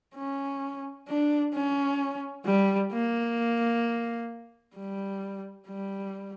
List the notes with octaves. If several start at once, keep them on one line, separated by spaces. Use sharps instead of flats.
C#4
D4
C#4
G3
A#3
G3
G3